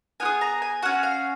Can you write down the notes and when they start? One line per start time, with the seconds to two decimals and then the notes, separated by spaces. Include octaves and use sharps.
0.20 B3 F4 G#5
0.25 G#4
0.41 A#5
0.62 G#5
0.82 C#4 F#4 F#5
1.03 F5